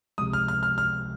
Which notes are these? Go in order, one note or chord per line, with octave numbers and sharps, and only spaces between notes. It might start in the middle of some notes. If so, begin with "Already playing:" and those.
C#2 C3 F3 G#3 D#6
F6
F6
F6
F6